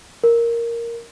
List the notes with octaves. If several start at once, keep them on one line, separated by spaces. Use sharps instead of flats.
A#4